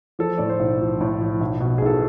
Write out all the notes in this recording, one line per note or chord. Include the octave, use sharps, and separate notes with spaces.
F3 A4
A2 D5
C5
B1
F3
A2
F3
B1
B2
G#4
B1 A4